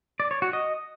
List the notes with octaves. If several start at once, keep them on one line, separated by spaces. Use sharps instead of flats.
D5
C#5
F#4
D#5